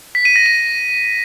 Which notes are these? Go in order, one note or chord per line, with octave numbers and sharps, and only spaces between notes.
B6
D#7
A#6
D#7